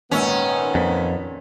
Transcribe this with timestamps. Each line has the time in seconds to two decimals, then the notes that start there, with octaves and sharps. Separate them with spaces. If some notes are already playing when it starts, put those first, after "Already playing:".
0.11 G#1 A#2 D#3 B3 C#4 E6
0.75 F2 A#2 B6